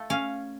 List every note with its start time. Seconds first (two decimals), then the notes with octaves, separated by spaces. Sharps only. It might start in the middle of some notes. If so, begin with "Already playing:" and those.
Already playing: A3 F4
0.10 C#4 F5